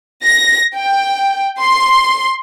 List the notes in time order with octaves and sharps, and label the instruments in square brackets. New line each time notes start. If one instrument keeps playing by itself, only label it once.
[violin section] A#6
G5
C6